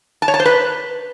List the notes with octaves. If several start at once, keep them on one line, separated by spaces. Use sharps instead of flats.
A5
C#5
A5
C5
B4